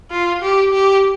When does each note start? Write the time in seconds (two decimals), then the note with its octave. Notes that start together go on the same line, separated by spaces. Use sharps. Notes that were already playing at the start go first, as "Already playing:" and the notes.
0.11 F4
0.42 G4
0.73 G4